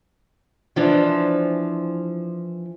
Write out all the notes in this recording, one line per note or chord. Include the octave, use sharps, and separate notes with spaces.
E3 F3 D4